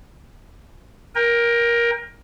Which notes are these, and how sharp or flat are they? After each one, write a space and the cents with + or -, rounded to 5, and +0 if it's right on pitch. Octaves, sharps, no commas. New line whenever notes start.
A#4 +15 G5 +40